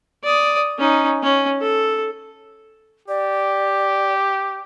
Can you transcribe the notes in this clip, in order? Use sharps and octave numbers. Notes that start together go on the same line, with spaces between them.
D5 D#6
C#4 D#4
C#4
A4
G4 D5